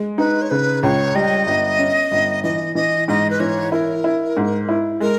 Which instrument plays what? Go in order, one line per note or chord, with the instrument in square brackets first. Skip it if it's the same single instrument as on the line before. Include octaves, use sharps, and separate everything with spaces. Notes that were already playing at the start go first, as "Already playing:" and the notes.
Already playing: [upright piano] G#3
[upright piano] D#4 [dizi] B4
[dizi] C#5
[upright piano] C#3 [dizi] B4
[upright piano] C#2 [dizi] C#5
[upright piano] G3 [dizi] D#5
[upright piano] G1
C#4
G1
[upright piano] E3 [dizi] D#5
[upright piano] E3 [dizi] D#5
[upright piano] G#2 [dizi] D#5
[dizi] B4
[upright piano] E3 [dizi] C#5
[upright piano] E4 [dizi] A#4
[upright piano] E4
G#2
E4
[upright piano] G#3 [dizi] A#4